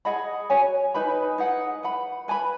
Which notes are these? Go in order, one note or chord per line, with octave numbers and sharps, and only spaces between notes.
G#4 D#5 F#5 B5
F#4 C#5 G#5
D#4 B4 G#5 B5
D#4 G#4 B4 F#5
B4 F#5 B5
B4 G#5 B5